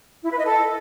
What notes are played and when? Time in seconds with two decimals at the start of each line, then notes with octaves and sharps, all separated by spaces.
0.23 E4
0.31 B4
0.38 D#5
0.45 A4